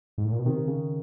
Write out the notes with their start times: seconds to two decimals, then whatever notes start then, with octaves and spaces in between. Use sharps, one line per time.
0.18 G#2
0.25 A2
0.32 A#2
0.39 B2
0.46 C3 D#3
0.68 C#3